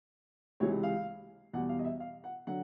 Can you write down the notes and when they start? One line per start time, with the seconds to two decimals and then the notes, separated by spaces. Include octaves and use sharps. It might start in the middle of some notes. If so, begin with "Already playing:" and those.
0.60 C#2 C3 E3 G#3 C#5
0.83 F5
1.53 E2 B2 G3 F#5
1.69 F5
1.79 D#5
1.85 E5
2.00 F5
2.24 F#5
2.47 D3 F#3 F#5